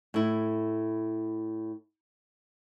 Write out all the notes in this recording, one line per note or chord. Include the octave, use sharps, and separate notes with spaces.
A2 E4